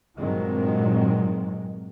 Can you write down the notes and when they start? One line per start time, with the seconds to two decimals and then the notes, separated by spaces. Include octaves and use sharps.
0.17 G2 A#2 D#3 F#3 G#3 C4